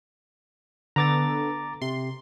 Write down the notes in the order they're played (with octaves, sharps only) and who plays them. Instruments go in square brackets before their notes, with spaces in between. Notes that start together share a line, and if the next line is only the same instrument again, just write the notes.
[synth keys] D3 B3 A4 [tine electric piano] A#5 D6 A6
[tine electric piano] C3 [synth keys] C6